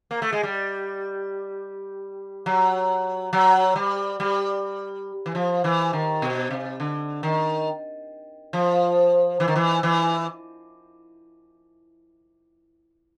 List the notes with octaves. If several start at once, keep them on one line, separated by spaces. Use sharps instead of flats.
A#3
A3
G#3
G3
F#3
F#3
G3
G3
E3
F3
E3
D#3
B2
C3
D3
D#3
F3
E3
D#3
E3
E3